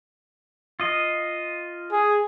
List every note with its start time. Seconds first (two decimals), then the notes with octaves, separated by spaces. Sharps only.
0.80 F4 D#5
1.92 G#4